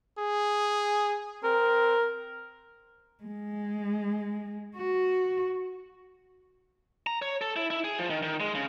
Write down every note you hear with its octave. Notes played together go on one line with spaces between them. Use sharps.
G#4
C4 A#4
G#3
F#4
A#5
C#5
A4
E4
E4
G#4
F3
D#3
D#3
G#3
C#3